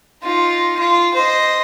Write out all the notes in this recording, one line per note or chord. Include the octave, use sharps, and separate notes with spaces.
D#4 F4
F4
C5 D#5